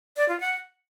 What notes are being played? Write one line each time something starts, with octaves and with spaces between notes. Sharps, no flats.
D5
F4
F#5